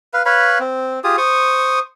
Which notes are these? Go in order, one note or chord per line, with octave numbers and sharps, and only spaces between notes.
B4 F5
B4 C#5 F5 B5
C4
F4 G4 G#4 D#6
C5 C#6 D#6